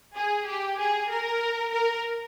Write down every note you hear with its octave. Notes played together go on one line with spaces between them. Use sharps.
G#4
G4
G#4
A#4
A#4